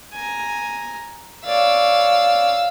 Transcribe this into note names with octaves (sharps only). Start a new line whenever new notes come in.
G#5 A#5
C#5 D5 F5 E6